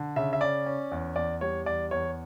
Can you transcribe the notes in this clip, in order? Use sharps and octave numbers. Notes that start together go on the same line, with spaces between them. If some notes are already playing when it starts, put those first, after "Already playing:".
Already playing: D3
C#3 E5
E5
C#4 D5
C#4
E2
E2 D5
G3 C#5
E2 D5
E2 C#5